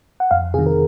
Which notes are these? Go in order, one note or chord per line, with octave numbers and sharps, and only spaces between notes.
F#5
F2 F5
C3 D#3 G#4
A#4